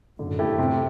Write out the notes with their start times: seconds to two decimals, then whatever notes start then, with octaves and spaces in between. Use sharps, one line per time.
0.19 F#2 A2 D3
0.39 A3 E4 G4
0.58 F#2 A2 C3